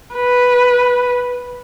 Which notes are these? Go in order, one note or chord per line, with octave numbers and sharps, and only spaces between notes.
B4